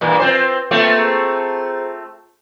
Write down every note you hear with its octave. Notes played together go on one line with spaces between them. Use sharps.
G2 A#2 E3 B4 C6
C4 F4 B4 C5
A3 A#3 C4 F4 B4 E5
G#4 C5 A#5